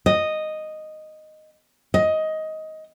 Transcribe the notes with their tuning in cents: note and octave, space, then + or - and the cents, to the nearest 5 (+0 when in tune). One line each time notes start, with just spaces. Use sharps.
D#5 -5
D#5 +15